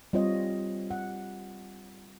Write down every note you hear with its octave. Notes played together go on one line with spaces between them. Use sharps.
G3 C4 F4 C#5 D#5
F#5